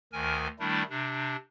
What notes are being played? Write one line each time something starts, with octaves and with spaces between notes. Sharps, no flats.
D2 D#3 A#4 G#5
D#3 G3 A3 D4 E4
C3 D4